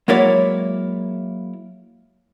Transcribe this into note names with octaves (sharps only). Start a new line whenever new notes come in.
F#3 G#3 A#3 E4 C#5 D5